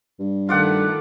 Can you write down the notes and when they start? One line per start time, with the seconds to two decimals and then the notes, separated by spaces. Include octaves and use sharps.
0.19 G2
0.49 D#3 A3 F4 D5 F#5